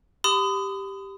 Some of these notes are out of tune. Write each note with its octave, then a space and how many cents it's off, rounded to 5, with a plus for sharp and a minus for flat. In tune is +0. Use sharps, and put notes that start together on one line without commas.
G4 +0 B5 +45 D#6 +0